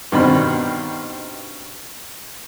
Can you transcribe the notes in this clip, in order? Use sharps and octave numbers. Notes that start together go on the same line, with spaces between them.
G2 B2 D#3 C4 B5